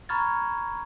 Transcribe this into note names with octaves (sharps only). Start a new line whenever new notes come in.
A#5 B5 C#6 F6 G#6 A6